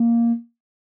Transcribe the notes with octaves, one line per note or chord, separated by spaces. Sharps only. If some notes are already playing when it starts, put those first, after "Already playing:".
Already playing: A#3